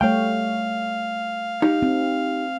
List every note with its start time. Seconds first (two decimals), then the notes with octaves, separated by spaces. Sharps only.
0.01 G3 A3 C#5 F5 G5
1.62 D#4 G4
1.82 C4